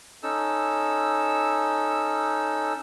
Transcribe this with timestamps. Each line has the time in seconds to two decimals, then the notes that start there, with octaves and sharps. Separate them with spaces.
0.23 C#4 D#4 A4 E6